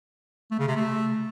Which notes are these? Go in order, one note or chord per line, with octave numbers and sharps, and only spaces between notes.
A3
C#3
C3
A3